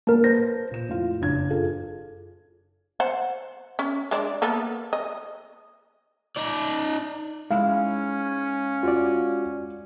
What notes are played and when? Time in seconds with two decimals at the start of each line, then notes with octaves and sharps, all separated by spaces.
0.07 A#3 A#4 A5
0.24 B4 C5 G6 A#6
0.71 A#2 E7
0.88 F2 A2 F4
1.21 F#1 D4 G#6
1.50 F4 G#4 A4
3.00 C5 F#5
3.79 C#4
4.11 G#3 D4 D5
4.42 A#3 B3 A4
4.93 D#5
6.37 D#4 D5
7.51 G#2 G#3 C#4 E4 F5
8.83 F4 F#4 D5